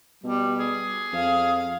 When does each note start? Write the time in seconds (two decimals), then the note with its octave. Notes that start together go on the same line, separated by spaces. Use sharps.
0.24 B2 G3
0.59 G#4
1.13 F2 F5